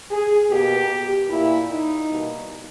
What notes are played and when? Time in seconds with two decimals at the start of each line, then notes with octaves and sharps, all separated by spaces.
0.11 G#4
0.50 B2 A#3 G4
1.29 A#2 A#3 E4
1.69 D#4
2.09 B2 G3 A#3